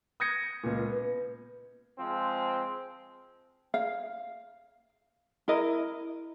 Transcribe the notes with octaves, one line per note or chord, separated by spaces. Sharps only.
D#6 G6 G#6 A#6 C#7
C#2 A#2
B3
F3 G#3 C4
F5
E4 A#4 D#5